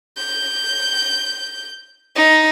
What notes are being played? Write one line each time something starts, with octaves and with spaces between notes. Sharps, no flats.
G6
D#4